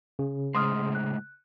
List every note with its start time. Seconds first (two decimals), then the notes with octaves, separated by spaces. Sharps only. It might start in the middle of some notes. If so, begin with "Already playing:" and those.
0.19 C#3
0.55 A2 G#3 C5 C6 D#6 F6
0.95 F#6